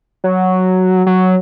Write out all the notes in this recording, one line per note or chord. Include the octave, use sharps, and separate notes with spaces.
F#3
F#3